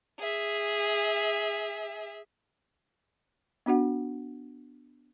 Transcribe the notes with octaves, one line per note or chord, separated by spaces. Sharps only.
G#4 E5
B3 D4 F#4 F#5